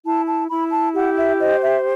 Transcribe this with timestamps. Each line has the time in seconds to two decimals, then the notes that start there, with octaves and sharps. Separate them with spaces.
0.06 E4 A5
0.27 A5
0.49 E4 B5
0.73 A5
0.95 G4 F#5
1.16 E5
1.39 C5 D#5
1.62 E5